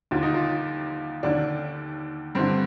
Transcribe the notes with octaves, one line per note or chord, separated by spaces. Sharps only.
D#2 D3 F4
D#4
F4
D#2 D3 D4
G2 D3 C4